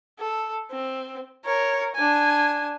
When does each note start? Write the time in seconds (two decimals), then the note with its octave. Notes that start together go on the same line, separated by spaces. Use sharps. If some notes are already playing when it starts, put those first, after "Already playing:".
0.20 A4
0.71 C4
1.45 A#4 C#5
1.95 D4 G#5